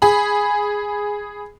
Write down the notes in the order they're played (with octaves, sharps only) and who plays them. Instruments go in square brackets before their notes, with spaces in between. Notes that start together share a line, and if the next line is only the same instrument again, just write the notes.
[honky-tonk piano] G#4 B5